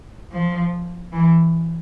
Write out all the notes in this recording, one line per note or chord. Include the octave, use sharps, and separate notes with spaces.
F3
E3